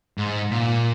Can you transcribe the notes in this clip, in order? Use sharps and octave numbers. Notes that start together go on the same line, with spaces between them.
G#2
A#2